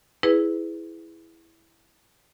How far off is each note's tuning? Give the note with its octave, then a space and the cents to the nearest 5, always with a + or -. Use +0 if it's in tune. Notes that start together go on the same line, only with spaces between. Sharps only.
E4 +0 G#4 +0 B4 +15